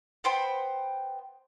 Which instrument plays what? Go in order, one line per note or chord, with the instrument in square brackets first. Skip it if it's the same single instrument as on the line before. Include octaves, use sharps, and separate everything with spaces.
[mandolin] B3 C5 G5 B5